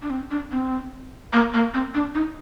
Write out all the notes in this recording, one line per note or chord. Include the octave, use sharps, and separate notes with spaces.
D4
C4
D4
C4
A#3
A#3
C4
D4
D#4